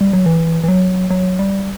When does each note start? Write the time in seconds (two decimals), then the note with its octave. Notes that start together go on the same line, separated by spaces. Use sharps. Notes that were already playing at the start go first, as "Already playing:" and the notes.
0.01 G3
0.13 F#3
0.26 E3
0.64 E3
0.68 F#3
1.10 F#3
1.39 G3